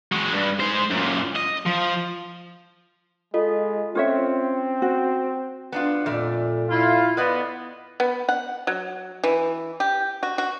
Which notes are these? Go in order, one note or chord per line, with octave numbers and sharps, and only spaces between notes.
G#3 F#4
G2
G#3 C5
F#2 A#2
D#5
F3
G#3 F4 A4 D#5
C4 C#4 F4 C#5 E5
F#4
B3 D4 F4
F2 A#2 A3 D5
E4 F4
B3 B4 D5 D#5
B3
F#5
F#3
E3
G4
F#4
F#4